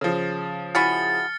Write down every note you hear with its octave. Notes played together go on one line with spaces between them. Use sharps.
C#3 F3
E4 F#4 G#4 F6 A6 C#7